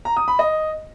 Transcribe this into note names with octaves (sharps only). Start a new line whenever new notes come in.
A#5
D#6
B5
D#5